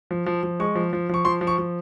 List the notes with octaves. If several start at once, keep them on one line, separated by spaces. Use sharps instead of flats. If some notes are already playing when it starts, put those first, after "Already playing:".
F3
F3
F3
G#3 C#6
F3
F3
F3 C#6
F3 C6
F3
C#6
F3